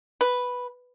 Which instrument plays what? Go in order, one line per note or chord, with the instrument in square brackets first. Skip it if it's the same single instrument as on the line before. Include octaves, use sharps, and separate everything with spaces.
[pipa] B4